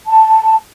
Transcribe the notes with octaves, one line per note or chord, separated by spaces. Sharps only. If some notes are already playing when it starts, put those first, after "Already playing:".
A5